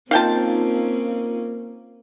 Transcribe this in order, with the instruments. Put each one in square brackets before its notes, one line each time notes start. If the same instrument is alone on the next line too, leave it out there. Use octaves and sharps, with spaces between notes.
[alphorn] A#3 [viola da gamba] C4 C#4 [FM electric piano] D#4 F4 [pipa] F5 G5 A5